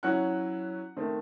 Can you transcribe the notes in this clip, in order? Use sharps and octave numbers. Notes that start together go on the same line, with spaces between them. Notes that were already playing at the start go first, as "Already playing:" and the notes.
F#3 C#4 E4 F#5 F#6
D#3 A3 C4